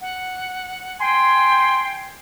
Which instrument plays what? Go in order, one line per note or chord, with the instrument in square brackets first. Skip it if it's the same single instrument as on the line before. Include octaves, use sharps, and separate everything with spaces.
[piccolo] F#5
[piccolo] G5 [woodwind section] G#5 C6